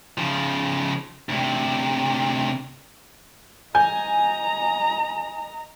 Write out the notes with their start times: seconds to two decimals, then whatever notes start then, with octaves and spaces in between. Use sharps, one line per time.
0.18 C#3 F3
1.29 D2 C3
3.75 D#5 G#5 A#5 G6